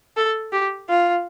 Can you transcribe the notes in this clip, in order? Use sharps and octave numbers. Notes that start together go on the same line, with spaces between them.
A4
G4
F4